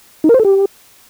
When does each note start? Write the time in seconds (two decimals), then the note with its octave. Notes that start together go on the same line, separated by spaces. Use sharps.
0.24 D#4
0.29 A#4
0.34 C5
0.40 A4
0.45 G4